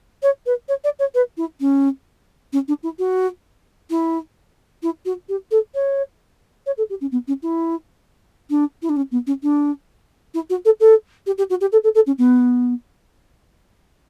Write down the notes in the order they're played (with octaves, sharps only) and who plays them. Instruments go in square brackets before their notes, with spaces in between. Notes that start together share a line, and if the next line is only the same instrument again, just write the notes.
[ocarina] C#5
B4
C#5
D5
C#5
B4
E4
C#4
C#4
D4
E4
F#4
E4
E4
F#4
G4
A4
C#5
C#5
A4
G4
C#4
B3
C#4
E4
D4
E4
D4
C#4
B3
C#4
D4
E4
F#4
A4
A4
G4
G4
F#4
G4
A4
A4
A4
C#4
B3